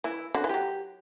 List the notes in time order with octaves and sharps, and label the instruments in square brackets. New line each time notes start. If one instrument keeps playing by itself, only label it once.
[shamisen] E3 [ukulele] E4
[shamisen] D3 [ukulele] F#4
[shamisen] E3
[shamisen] F#3 [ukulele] G4